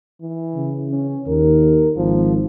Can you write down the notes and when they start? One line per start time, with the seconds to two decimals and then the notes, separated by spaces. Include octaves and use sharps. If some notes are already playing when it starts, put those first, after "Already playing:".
0.21 E3
0.55 C#3
0.90 C#4
1.28 D#2 A#4
1.97 G#1 F3